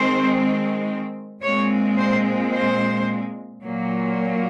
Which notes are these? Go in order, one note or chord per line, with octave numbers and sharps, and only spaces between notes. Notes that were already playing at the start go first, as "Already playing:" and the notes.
Already playing: D#3 G#3 C4 C5
A#2 G#3 C4 C#5
C5
C5
A#2 F#3 A#3